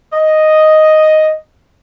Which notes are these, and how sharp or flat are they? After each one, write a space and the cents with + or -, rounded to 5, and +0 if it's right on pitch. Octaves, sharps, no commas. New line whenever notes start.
D#5 +0